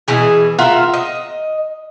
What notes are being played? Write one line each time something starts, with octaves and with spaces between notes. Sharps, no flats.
B2 E3 G#4
F4 F#4 A#4 E5
D#5